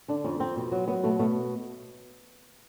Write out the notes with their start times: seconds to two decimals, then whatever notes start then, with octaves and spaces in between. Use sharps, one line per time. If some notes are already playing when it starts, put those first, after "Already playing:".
0.08 D3 D4
0.24 F2 C#4
0.40 F2 C4
0.56 B2
0.72 F#3
0.88 F#3 B3
1.03 B2 A3
1.19 B2 A3